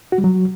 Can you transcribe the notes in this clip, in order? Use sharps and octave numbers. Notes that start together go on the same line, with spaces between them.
F#4
G3
F#3